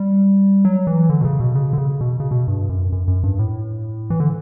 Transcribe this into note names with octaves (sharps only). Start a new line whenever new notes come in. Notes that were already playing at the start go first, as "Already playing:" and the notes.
Already playing: G3
F#3
E3
D3
B2
C#3
B2
C#3
D3
C#3
B2
C#3
B2
G2
F#2
F#2
F#2
G2
A2
E3
D3